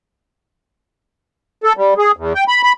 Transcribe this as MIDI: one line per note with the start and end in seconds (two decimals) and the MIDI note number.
1.64 1.73 69
1.77 1.94 55
1.98 2.12 68
2.17 2.33 40
2.35 2.44 79
2.48 2.62 83
2.63 2.73 83